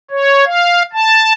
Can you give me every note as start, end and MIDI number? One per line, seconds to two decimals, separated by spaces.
0.11 0.45 73
0.46 0.83 77
0.93 1.33 81